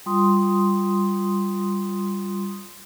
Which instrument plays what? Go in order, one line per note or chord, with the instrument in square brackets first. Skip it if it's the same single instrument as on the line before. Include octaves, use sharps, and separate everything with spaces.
[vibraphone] G3 F4 C6 D#6